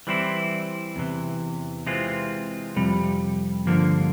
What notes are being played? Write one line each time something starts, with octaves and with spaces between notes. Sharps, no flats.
E3 G3 C4 E4
E2 C3 E3
C3 E3 G#3 C4 F4
F2 C3 G3
G2 D3 F3 A#3